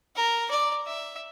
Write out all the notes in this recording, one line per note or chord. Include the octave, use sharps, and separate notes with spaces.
A#4
D5
E5